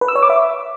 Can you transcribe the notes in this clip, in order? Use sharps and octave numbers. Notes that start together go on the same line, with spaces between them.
B4
E6
C#5
D6
E5